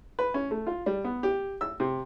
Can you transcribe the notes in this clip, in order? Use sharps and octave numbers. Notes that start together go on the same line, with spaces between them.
B4
C#4
A3
F4
G3
B3
G4
E6
C3